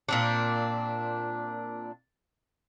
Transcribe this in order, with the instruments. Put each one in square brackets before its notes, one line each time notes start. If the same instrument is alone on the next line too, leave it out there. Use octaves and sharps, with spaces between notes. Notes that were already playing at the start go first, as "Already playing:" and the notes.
[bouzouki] A#2 C4 D4